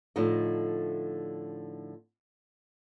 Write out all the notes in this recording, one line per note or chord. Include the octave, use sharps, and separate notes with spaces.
A2 D3 F3 D#4 D#5